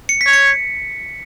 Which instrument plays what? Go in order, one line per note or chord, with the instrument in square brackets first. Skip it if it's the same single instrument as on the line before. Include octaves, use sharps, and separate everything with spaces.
[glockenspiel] C#7
B6
[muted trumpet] C#5
[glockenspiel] C#7